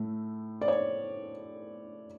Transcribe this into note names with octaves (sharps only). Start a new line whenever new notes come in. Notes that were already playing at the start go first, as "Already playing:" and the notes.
Already playing: A2 A3
D5
C#5